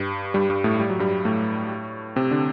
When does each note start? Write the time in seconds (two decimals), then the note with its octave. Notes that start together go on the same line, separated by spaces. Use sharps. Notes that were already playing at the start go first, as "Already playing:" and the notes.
Already playing: G2 G3
0.34 G2 G3
0.50 G2 G3
0.64 A2 A3
0.80 G3
0.90 F#3
0.99 G2 G3
1.25 A2 A3
2.16 C3 C4
2.31 D3 D4